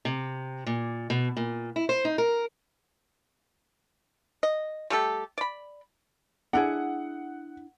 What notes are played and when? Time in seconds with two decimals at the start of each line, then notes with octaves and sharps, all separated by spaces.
0.05 C3
0.66 A#2
1.10 B2
1.37 A#2
1.76 E4
1.89 C5
2.05 D#4
2.18 A#4
4.43 D#5
4.90 G3 A3 G4 A4
5.38 D5 B5
6.53 D4 E4 G#4 F#5